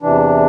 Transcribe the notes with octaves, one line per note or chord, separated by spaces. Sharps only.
E2 C3 E3 D4